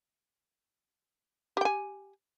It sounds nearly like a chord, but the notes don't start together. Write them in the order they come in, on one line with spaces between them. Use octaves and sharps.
G4 G5 G#5